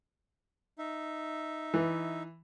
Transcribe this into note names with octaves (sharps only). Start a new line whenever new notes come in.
D#4 E5
E3